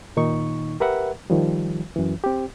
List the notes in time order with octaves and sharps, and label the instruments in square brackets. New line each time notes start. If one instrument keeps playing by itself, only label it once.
[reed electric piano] A#2 D#3 D#4 C#6
G4 A#4 B4 E5 F#5
D#3 F3 G3
F#2 E3
C4 G4